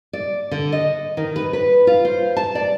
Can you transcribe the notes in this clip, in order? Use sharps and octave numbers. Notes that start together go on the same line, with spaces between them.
D5
D3
D#5
D#3
B4
B4
F4
C5
A5
D5